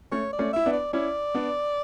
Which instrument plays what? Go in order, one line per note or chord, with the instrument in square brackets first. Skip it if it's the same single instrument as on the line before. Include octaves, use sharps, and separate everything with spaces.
[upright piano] A3 C#4 [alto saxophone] C#5
[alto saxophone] D5
[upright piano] A3 C#4
[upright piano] E4 [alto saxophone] E5
[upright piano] B3 D4
[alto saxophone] D5
[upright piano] C#4 E4 [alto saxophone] D5
[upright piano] B3 D4